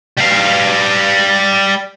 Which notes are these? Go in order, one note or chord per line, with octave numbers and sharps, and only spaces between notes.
G3 F5